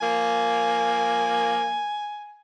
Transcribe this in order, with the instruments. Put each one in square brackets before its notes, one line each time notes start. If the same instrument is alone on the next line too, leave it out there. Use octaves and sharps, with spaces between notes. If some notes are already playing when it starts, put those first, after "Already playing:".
[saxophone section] F3 A#3 [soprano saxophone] G#5